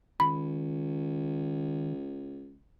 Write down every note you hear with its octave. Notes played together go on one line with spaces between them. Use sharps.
C#2 D#3 B5